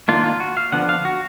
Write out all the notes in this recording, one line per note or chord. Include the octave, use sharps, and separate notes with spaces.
D#3 A#3 D4 F4
F4
F#4
F5
D3 F3 B3 D4 F#5
F5
F#4